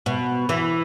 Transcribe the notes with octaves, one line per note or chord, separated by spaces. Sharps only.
B2
E3